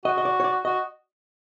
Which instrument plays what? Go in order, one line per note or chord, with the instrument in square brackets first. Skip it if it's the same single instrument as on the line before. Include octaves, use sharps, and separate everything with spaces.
[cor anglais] F#4 [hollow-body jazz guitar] D#5
[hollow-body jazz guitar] D#5
D5
C#5
D5
[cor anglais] F#4 [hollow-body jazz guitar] D#5